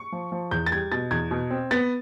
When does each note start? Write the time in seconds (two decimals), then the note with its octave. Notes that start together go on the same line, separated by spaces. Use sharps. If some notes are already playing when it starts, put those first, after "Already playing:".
Already playing: C#6
0.12 F3
0.32 F3
0.51 E2 G6
0.66 A6
0.71 G3 G#6
0.92 B2 A6
1.11 E2 G#6
1.31 B2
1.51 C4
1.71 B3 A6